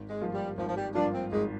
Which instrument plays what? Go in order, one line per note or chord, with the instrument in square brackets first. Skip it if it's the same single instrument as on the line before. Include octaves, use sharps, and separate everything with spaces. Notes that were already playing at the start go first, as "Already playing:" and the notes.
Already playing: [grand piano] G#1
[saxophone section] G#3
[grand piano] G2 F3 A#3 F4
[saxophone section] G3
[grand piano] G#1 [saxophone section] F3
[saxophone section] F3
G3
[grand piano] G2 F3 A#3 F4 [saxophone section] D4
[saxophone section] C4
[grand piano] G#1 [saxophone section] G#3